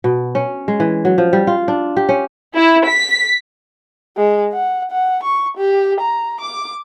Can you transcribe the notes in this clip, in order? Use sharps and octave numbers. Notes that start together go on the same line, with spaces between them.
B2
C#4
G#3
E3
F#3
F3
G3
F4
D4
G4
C#4
E4
B6
G#3
F#5
F#5
C#6
G4
A#5
D6